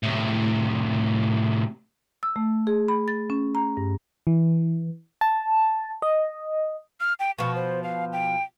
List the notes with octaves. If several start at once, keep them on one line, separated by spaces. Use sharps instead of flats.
A2 C3
E6
A3
G#4
B5
A6
C#4
A#5
G2
E3
A5
D#5
F6
G5
B2 F3 C#6
C5
F5
G5